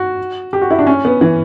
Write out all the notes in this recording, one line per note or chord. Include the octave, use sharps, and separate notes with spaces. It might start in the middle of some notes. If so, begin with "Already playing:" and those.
Already playing: F#4
G4
F#4
E4
D4
C#4
B3
E3